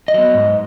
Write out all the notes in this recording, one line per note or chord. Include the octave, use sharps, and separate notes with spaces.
D#5
F#3 B3
G#2